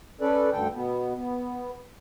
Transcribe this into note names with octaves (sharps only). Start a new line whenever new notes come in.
C#4 A4 B4 D5
D2 G2 D3 A4 G5
B2 B3
B3